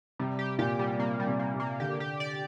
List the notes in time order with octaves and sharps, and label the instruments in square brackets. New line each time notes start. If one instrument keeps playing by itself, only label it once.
[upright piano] C3 [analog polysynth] G3
[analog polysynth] G4
[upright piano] A#2 [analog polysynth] G4
[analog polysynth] G3
[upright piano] C3 [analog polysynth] A#3
[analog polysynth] G3
[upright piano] C3
[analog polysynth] A#3
[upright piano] C3
[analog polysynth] A#3
[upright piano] D3 [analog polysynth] G4
[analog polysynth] G4
D5